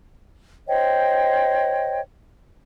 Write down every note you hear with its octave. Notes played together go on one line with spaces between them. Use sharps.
C5 C#5 D#5 G5